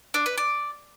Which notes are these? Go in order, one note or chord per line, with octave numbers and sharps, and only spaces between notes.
D4
B4
D5